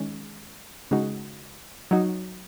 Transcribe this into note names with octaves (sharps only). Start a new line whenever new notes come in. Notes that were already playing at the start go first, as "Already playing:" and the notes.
Already playing: D#3 G#3 C#4
C#3 G#3 D#4 F#4
F#3 D#4 F#4